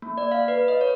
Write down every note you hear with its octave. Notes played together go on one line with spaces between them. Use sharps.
A#3
D5
F5
B4
D#5
C#5